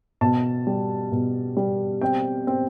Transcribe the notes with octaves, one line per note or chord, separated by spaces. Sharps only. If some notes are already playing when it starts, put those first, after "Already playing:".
B2 A5
G3
B2
G3
C4 G5
C4